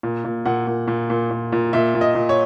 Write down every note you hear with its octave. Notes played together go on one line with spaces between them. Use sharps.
A#2
A#2
A#2 F#5
A#2
A#2
A#2
A#2
A#2
A#2 E5
A#2
D#5
A#2
C#5